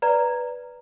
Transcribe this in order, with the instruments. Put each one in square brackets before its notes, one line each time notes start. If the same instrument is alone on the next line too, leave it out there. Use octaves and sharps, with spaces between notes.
[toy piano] B4 D5 A#5